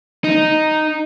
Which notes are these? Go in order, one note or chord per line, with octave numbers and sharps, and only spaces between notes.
D#4